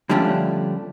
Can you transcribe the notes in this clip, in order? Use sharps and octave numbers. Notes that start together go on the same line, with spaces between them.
D3 F3 G3 A3 C#4 D4